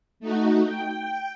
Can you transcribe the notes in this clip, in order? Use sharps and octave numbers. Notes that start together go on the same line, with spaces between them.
A3 D#4 F#4
G5